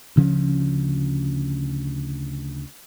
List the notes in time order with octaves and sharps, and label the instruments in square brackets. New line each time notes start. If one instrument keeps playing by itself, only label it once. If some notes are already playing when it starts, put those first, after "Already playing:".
[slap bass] D2 C#3 F3 C#4